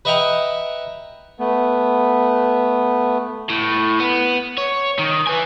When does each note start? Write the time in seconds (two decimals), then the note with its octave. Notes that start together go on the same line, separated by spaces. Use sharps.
0.05 B4 D#5 E5 F#5 G5 A#5
1.39 A3 B3
3.50 A2
4.00 B3
4.58 C#5
4.99 D#3
5.27 B4 G#5